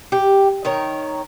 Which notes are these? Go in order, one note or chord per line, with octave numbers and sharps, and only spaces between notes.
G4
D#3 A#4 C#5